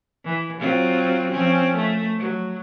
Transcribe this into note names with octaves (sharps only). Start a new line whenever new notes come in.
E3
F#3 C4 F4
F3 C4 C#4
A3
F#3